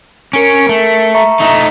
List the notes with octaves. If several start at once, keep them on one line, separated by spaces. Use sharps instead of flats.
C#4 A#4 C#7 D7
A3
E5 A#5 C#6
A3 D#4